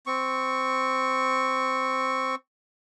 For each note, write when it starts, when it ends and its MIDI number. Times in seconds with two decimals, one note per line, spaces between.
0.06 2.35 60
0.06 2.35 85